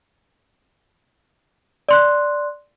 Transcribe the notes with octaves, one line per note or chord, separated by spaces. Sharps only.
D5 C6 F#6